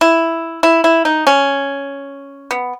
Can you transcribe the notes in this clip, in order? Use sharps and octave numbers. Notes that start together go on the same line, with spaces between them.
E4
E4
E4
D#4
C#4
B3